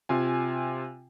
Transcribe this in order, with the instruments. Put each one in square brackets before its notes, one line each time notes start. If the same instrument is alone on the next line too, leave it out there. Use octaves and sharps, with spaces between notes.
[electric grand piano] C3 F4 G#5